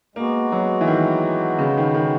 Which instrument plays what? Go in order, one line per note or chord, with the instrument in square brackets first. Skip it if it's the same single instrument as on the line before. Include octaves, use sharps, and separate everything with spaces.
[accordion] G#3 B3 F#4 [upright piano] A#3
[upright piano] F#3
E3
D#3
C#3
D#3
D#3